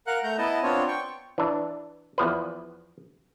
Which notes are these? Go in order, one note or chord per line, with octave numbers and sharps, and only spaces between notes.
A#4 F5 F#5 F#6
A3 A#5 G6
B3 E4 D#5 A5
B3 C4 D4 F4 C#5
G5 C#6
E3 D4
E2 F3 B4